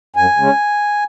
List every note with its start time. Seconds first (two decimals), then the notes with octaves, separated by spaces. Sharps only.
0.16 F#2 G#5
0.37 C#3 G#3 C#4